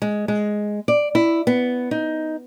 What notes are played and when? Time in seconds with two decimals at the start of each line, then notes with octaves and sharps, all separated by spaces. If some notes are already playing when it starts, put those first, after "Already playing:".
0.02 G#3
0.28 G#3
0.88 D5
1.15 E4
1.47 B3
1.91 D#4